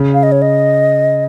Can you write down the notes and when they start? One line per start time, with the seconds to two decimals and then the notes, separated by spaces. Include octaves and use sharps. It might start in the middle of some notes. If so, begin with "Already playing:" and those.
Already playing: C#3
0.14 F5
0.23 D#5
0.32 C#5
0.42 D#5